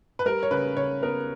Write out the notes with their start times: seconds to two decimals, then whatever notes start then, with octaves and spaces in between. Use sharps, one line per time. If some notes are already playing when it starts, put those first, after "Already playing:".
0.19 B4
0.25 G3 A#4
0.43 C#5
0.51 C#3 B4
0.77 C#3 C#5
1.03 B3 A#4